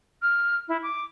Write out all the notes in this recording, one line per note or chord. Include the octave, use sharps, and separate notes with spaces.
F6
E4
D6